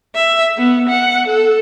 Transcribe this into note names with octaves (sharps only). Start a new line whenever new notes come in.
E5
B3
F#5
A4